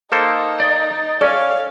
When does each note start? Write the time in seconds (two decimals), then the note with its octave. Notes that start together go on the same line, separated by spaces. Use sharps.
0.12 A#3 D#4 A4 C5
0.60 D5 D#5
1.21 C#4 A4 C#5 D5 F5